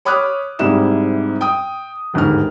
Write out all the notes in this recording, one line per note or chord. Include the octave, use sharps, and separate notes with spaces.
C#5 B5 D6 D#6 F6 F#6
G#2 C3 G3 E4 E7
G5 D#6
G1 D#2 G#2 F6